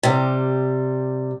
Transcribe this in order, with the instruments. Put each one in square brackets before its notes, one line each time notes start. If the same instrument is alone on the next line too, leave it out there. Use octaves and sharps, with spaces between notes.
[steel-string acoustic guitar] C3 G3